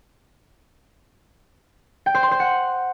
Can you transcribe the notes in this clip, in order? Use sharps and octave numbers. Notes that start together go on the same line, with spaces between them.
G5
C5
C6
C5
F#5